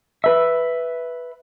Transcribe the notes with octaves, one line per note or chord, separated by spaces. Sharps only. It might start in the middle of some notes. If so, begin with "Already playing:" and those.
B4 E5